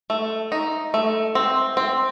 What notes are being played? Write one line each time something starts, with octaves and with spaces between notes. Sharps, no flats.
A3
D#4
A3
C4
C4